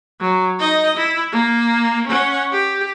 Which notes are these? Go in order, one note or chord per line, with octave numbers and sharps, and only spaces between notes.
F#3
D#4 D#5
E4
A#3
C#4 F#5
G4